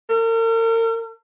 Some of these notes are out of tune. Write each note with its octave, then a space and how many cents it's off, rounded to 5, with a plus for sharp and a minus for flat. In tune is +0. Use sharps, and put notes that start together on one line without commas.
A#4 -40